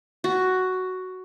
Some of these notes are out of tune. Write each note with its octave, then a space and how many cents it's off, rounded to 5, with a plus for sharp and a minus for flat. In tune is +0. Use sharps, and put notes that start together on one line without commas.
F#4 +5